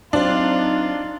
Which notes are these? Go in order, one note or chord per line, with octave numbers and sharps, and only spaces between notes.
F#3 C4 D4 D#4 F4